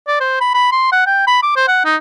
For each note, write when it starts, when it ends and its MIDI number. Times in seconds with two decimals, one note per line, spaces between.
0.08 0.17 74
0.20 0.39 72
0.41 0.50 83
0.54 0.68 83
0.72 0.89 84
0.92 1.03 78
1.06 1.26 79
1.27 1.38 83
1.43 1.52 86
1.56 1.64 72
1.68 1.82 78
1.85 1.96 63